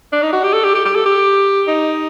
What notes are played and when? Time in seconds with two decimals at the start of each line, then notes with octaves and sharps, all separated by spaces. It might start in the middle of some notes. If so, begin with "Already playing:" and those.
0.12 D4
0.22 D#4
0.33 F#4
0.44 G4
0.53 A4
0.64 G4
0.75 G4
0.85 G4
0.95 A4
1.06 G4
1.67 D#4